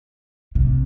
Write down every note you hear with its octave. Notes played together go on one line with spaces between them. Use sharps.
C3